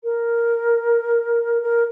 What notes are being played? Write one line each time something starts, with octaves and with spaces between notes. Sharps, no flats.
A#4
A#4